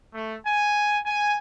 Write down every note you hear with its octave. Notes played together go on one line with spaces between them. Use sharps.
A3
G#5
G#5